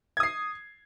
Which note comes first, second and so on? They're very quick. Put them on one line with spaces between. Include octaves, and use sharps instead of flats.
G#6 D#6 C7